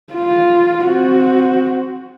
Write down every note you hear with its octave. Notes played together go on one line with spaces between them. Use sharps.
F4
C4 F#4